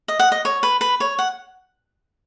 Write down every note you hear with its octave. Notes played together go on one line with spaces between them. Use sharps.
D#5
F#5
D#5
C#5
B4
B4
C#5
F#5